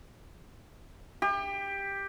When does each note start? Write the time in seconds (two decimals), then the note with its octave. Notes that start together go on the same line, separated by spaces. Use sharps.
1.22 G4